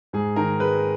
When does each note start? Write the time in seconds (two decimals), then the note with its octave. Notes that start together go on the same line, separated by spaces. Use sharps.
0.13 G#2 G#4
0.36 D#3 A#4
0.60 G#3 B4